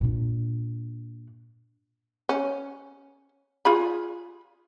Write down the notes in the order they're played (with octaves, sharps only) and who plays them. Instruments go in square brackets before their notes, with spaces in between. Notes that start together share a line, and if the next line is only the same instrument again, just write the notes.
[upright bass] A#2 D4
[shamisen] C#4
F4 G#4 B5